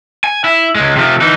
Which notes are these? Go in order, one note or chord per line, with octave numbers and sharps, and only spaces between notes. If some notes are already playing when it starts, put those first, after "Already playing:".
G#5
E4
C#2 G#3
C3 F3
E3 D#4